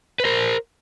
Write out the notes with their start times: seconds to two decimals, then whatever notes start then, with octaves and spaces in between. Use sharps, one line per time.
0.20 B4
0.25 A#4 C5